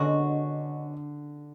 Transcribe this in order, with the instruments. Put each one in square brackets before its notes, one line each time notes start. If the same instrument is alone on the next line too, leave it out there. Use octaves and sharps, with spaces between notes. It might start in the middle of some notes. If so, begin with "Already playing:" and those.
Already playing: [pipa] B2 G#3 C#4 F#4 [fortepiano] D3